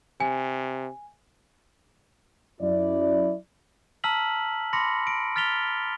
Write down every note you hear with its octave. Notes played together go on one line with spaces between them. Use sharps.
C3 G#5
F#2 E4 D5
A5 A#5 E6 F6 B6 F#7
B5 C6 D6 A#6 C#7
D7
F6 A6 B6 F7 G7